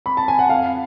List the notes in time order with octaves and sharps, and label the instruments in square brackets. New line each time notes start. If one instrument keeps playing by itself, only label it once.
[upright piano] B5
A5
G#5
F#5
F2 F5